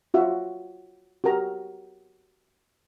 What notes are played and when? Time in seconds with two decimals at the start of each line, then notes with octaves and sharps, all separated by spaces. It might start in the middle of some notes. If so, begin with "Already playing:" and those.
0.14 F4 F#4 E5
1.24 F#4 G4 A#4 A#5